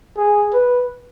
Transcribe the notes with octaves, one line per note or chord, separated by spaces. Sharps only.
G#4
B4